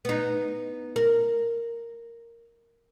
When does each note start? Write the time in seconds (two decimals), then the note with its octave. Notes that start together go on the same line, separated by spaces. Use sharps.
0.05 B3 D#4
0.96 A#4